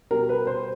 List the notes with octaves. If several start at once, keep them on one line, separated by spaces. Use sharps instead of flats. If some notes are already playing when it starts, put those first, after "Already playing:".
B2 G3 A#4
B4
C5